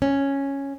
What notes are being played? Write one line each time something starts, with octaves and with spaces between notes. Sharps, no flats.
C#4